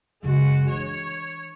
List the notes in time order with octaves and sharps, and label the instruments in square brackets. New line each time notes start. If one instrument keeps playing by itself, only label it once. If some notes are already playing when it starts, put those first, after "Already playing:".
[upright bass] F#2 C#3 [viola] G#3 F#4
[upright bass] E3 D4 [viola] C#5